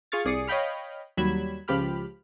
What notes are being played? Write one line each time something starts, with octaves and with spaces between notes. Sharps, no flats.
F4 G#4 C#6 F6 A6
C2 G#4 D5 D#6 C7 C#7
C#5 D#5 F5 G5 B5 F6
D#2 F#3 G3 B5 G#6 E7
C#2 F3 G4 B5 F6